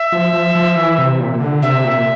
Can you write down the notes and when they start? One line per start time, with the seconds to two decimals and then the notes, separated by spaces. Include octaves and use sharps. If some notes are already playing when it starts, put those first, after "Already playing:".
Already playing: E5
0.12 F3
0.33 F3
0.55 F3
0.76 E3
0.98 C3
1.20 A#2
1.41 D3
1.62 C3 E5
1.85 A#2